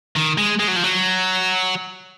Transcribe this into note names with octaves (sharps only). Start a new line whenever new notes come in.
D#3
G#3
G#3
F#3
F3
F#3